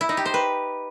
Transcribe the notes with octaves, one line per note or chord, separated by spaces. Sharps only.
E4
D#4
G4
C5
B4